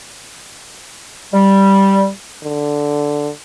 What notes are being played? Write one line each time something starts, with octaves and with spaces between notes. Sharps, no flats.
G3
D3